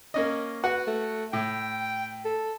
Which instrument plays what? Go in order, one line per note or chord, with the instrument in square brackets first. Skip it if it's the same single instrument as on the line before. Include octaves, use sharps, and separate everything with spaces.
[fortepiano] A#3 C#4 D#5
[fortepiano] F#4 F#5 [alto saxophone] B4
[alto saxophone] A3
[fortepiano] A2 [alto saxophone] G5
[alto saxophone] A4